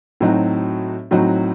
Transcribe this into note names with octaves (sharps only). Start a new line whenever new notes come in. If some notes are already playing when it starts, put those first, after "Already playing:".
A2 F#3 C4 D#4 F#4
A2 F#3 C4 D#4 F#4